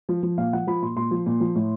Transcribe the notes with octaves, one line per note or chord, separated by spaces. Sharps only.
F3
F3
A#2 F5
F3 F#5
F3 B5
A#2 C6
A#2 C6
F3
A#2
F3
A2